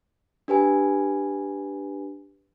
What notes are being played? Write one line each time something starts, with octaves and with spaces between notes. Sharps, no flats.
D4 G4 B4 G#5